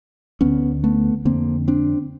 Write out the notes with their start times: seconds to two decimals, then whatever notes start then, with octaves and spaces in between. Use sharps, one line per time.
0.41 D2 D3 B3 C#4
0.84 A3 B3
1.25 F2 D3 A#3 C4
1.68 C4 D4